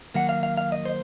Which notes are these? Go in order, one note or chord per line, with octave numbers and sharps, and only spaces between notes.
D#3 F#3 A#3 F#5
F5
F5
F5
D#5
C5